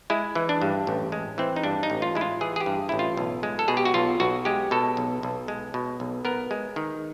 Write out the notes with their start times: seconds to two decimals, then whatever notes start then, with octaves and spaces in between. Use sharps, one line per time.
0.10 G#3 E4
0.35 E3
0.49 D4
0.62 G2
0.87 A1
1.12 G#3
1.38 E3 C4
1.56 D#4
1.63 G2 D4
1.83 D#4
1.90 A1
2.02 F4
2.15 G#3 E4
2.21 F4
2.41 E3 G#4
2.56 G#4
2.60 G4
2.66 G2
2.89 A1 E4
2.99 F4
3.17 B1
3.43 G#3
3.59 A4
3.68 B2 G#4
3.77 G4
3.85 F#4
3.94 B1 F4
4.20 B1 F#4
4.45 G#3 G4
4.71 B2 A4
4.97 B1
5.23 B1
5.48 G#3
5.74 B2
6.00 B1
6.25 B3 A#4
6.51 G#3
6.76 D#3